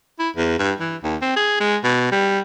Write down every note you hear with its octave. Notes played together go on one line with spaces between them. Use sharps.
E4
E2
G2
E3
D#2
C4
G#4
G#3
B2
G3